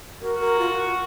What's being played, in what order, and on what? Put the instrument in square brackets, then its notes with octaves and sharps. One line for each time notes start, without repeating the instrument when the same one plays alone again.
[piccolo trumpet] F#4 [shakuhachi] A#4
[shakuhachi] A#4
F4